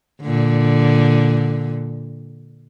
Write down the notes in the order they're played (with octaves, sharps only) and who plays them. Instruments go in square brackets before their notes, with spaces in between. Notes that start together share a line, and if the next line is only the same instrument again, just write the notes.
[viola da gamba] A#2 D3